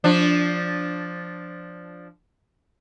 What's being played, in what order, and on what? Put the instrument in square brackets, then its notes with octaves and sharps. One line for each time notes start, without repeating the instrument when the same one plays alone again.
[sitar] F3 D4